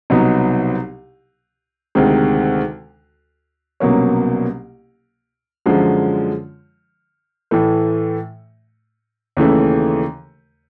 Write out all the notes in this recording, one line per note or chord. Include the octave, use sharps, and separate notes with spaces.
C2 B2 F#3 B3 D#4
D2 C3 D#3 G#3
C2 B2 F#3 A#3 C#4
F#2 D3 F3 G#3
A2 E3 A3
D#2 C#3 E3 A3